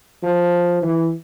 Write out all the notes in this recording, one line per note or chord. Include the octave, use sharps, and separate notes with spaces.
F3
E3